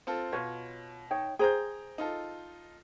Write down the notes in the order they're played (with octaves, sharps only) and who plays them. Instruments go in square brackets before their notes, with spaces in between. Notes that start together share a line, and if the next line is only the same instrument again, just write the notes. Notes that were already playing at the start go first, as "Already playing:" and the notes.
[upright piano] C4 F4 A4
[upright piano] B2 [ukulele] F4 B4 C#5
[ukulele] D#4 C#5 G5
[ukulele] G#4 C5 [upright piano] G5 A#5 G6
[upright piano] D#4 F4 A4